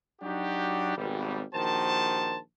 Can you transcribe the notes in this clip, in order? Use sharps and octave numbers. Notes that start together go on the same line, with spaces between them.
F#3 D4 D#4 F#4 G4
G#1 B2 G3
A#1 D#3 F#4 C5 A5